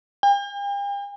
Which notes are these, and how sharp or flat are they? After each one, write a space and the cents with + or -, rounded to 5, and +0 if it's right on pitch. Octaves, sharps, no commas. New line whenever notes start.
G5 +45